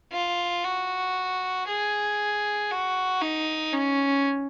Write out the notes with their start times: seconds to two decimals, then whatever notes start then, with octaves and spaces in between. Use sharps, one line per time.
0.12 F4
0.64 F#4
1.68 G#4
2.70 F#4
3.22 D#4
3.73 C#4